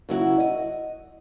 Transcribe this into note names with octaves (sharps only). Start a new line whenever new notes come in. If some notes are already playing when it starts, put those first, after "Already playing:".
C#3 F#3 E4 F#4
D#5